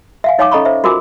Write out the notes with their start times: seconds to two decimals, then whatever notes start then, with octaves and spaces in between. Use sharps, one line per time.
0.24 E5 F5 G#5
0.39 D#4 C#5 F5 G#5 A5 D6
0.51 C#4 A4 D#5 A#5 B5 C#6
0.65 C5 E5
0.84 F4 F#4 A#4 G#5 D6